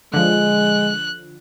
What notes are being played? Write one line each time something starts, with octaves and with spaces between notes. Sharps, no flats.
D3 F3 G#3 F#6